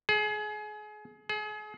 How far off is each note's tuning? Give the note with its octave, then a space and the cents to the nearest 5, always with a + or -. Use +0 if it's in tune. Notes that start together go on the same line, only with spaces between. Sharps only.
G#4 +30
G#4 +35